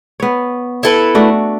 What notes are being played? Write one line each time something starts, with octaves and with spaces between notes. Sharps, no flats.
B3 C#5
E4 A4 B4
A3 D4 F#4